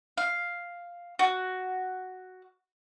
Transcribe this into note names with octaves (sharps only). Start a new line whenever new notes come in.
F5
F#4